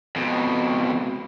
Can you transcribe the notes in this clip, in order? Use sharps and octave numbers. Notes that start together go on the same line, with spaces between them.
F2 B2